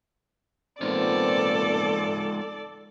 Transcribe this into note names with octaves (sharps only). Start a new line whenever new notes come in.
A#2 G#3 B3 C4 D#4 F4 A4 D5